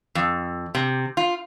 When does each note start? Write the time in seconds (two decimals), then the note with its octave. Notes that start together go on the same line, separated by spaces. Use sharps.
0.15 F2
0.75 C3
1.17 F4